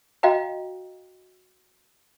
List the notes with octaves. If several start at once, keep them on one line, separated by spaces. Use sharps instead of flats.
F#4 D#5 F5 G5 A#5